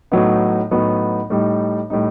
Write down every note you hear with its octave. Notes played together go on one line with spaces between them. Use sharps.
A2 F#3 B3 D#4
A2 F#3 B3 D#4
A2 G3 D#4
A2 G3 D#4